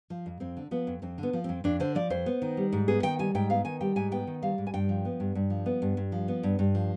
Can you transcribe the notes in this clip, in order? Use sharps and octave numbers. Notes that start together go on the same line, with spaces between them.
F3
F2
F2 C4
D3
F3 B3
F2
F2 C4
D3
B3
F3
F2 C4
F2 D4
D3 C5
F3 D5
F2 C5
B3
D#3
G3
G#2
B3 G#4
D#3 G5
G3 G#5
G#2 G5
B3 F5
D#3 G#5
G3 G5
G#2 G#5
B3 G5
D#3
G3 F5
G#2
G#5
G2 G5
F3
B3
G2
G2
F3
B3
G2
G2
F3
B3
G2
G2
F3